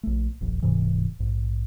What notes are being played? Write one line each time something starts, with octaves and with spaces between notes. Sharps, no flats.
A#1 A3
D#1 A#1 F2
D1 G#2 C3 E3
A#1 G#2